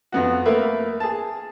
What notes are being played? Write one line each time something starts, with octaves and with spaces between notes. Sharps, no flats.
F2 B3 F#4
A3 A#3 A#4 B4 E5
G#4 A5